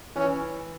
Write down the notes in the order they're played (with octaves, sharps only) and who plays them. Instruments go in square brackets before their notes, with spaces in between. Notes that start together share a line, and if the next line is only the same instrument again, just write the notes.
[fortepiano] E3 [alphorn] C#4